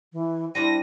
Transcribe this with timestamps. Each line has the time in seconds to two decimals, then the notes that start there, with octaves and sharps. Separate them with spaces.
0.13 E3
0.55 G3 C4 D4 E4 A#6 D#7